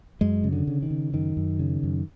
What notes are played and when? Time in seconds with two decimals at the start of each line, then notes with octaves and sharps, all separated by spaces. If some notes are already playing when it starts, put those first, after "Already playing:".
0.21 F#2 G#3
0.44 C#3
0.52 D3
0.67 C#3
0.82 D#3
0.90 C#3
1.13 F#2 D#3
1.37 F#2
1.59 C#3
1.83 F#2